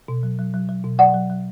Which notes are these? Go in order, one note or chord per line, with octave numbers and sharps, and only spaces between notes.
B2
F#3
F#3
F#3
F#3
B2
F#3 D5 F#5
F#3
F#3